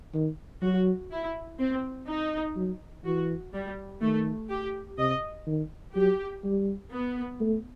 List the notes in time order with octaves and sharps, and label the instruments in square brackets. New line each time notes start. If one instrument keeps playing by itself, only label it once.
[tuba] D#3
[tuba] F#3 [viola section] F#4
[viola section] E4
C4
D#4
[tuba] F#3
[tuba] E3 [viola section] F#4
[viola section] G3
[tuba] D#3 [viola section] A3
[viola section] G4
[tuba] C3 [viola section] D#5
[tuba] D#3
[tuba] F#3 [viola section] G4
[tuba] G3
[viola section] B3
[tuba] A3